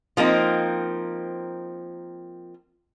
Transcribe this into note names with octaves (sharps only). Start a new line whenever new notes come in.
F3 A#3 C4 D#4